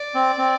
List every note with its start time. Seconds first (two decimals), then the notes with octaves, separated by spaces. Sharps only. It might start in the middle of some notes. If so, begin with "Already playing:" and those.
Already playing: D5
0.15 C4
0.38 C4